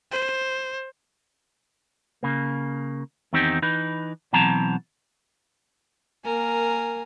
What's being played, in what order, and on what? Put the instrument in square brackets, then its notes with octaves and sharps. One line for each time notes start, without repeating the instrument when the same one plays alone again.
[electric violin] C5
[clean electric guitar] C#3 A#3
E2 D#3 C4 D#4 G4
E3 D#4 B4
B2 E3 F#3 C4 A5 A#5
[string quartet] A#3 A#4 G#5